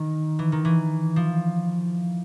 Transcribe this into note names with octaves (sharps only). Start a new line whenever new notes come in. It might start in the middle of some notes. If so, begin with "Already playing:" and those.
Already playing: D#3
E3
D#3
E3
F3